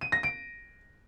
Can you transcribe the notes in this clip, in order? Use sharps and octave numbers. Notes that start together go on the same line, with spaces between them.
D#7
A#6
D7